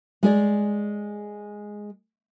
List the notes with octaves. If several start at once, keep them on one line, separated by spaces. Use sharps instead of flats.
G#3 G#4 D5